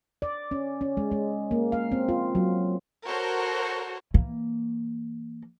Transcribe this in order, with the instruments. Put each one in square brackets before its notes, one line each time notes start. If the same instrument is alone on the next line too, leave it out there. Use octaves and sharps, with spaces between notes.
[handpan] D5
C#4
C#4
G#3
G#3
A#3
F5
C4
F4
F#3
[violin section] F#4 A4 A#4 C5 C#5
[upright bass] E3 A#3